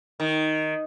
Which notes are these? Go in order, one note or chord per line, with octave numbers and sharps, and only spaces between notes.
D#3